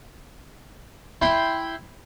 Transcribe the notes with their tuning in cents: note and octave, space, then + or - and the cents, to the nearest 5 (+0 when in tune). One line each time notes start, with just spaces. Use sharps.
E4 +0 G5 +0 C6 +0